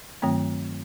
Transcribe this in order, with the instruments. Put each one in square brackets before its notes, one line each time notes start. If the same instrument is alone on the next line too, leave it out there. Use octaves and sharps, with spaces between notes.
[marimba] G2 D#3 F#3 A3 C4